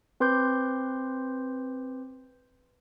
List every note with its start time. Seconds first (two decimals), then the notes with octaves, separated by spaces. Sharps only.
0.20 C4 B4 C6 D6 G6